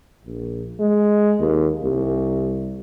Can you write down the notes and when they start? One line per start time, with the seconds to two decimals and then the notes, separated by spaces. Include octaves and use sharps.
0.25 A#1
0.80 G#3
1.40 D#2
1.83 C2